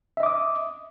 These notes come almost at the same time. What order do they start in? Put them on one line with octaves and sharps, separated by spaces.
E5 D#5 D6 D#6